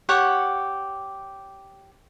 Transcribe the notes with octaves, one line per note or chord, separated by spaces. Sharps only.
G4 C#5 F#5 C#6